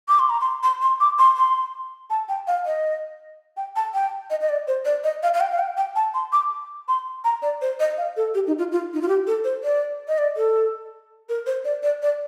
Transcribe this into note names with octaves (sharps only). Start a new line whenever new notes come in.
D6
C6
A#5
C6
C6
C6
D6
C6
C6
A5
G5
F5
D#5
G5
A5
G5
D#5
D#5
D5
C5
D5
D#5
F5
F5
G5
F5
G5
G5
A5
C6
D6
C6
A#5
D5
C5
D#5
F5
A4
G4
D#4
F4
F4
D#4
F4
G4
A4
C5
D5
D#5
D5
A4
A#4
C5
D5
D5
D5